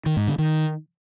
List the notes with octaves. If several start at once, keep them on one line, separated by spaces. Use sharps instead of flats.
D#3
G#2
D3
D#3